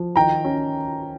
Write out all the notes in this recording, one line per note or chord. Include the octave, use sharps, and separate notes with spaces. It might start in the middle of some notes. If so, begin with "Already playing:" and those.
Already playing: F3
D#3 G5 A#5
C#4